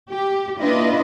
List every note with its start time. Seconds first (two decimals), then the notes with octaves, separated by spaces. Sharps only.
0.10 G4
0.58 A#3 D4 E4 F4 B4 D#5